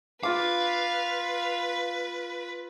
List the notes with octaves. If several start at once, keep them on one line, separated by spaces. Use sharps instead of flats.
F4 B4 F5 D6